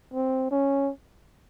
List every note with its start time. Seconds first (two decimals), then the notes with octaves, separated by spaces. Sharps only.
0.13 C4
0.51 C#4